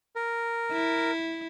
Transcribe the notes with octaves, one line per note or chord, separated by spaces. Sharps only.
A#4
E4